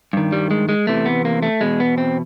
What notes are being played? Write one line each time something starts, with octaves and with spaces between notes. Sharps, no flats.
G2 D#3
G3
G#3
G#3
E2 C3 E3 A3
B3
A#3
A3
E2 B2 G#3
B3
C4